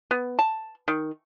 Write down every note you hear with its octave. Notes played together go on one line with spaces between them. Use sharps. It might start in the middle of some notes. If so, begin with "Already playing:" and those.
B3
A5
D#3